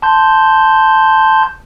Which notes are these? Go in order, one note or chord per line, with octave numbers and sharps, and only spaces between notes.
A5 C6 G6